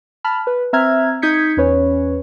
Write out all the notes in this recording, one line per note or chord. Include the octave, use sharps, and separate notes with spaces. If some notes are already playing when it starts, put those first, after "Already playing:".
A5 B5 F6
B4
C4 E5 A#5 E6 F6 G#6
D#4 D#6 G6 G#6 B6 C#7
E2 C#4 B4 C#5